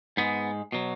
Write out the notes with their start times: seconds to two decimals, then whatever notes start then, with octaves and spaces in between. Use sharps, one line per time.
0.17 G#2 G#3 B3
0.72 B2 F#3